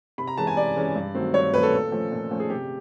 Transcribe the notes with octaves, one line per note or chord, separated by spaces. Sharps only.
C3 B5
A#5
E3 G#3 C#4 A5
G#5
C3 D5
E3 G#3 C#4
G2
D#3 F#3 A3 C4
G2 C#5
D#3 F#3 A3 C4 B4
A4
A#2
F3 A3 C#4
A#2
F3 A3 C#4
G#4
C3 G4